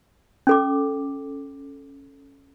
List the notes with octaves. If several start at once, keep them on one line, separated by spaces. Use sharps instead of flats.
C#4 A4 D6